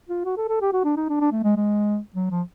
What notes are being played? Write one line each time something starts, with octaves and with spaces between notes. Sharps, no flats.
F4
F#4
A4
A4
G4
F#4
D4
D#4
D4
D4
A3
G#3
G#3
F#3
F3